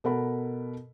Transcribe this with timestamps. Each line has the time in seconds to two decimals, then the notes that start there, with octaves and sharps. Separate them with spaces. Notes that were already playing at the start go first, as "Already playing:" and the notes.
0.04 B2 A4 A#4 F#5 B5